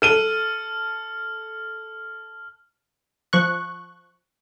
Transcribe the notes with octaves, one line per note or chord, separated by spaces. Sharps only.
A4 F6 D#7 G7
F3 C#6 F#6